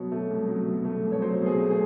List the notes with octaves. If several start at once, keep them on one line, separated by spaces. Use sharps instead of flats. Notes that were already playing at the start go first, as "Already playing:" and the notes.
Already playing: B2 F#3 C#5
A3
C2
F#3
B2
A3
C2
C#5
F#3 C5
B2
G#4
A3
G#4